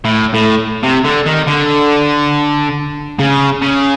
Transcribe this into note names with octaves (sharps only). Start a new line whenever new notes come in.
A2
A2
C3
D3
D#3
D3
C#3
C#3